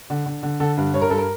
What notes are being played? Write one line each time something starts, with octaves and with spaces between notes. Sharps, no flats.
D3
D3
D3
D3 A4
G2
G2 C#5
A#4
G2 A4
A#4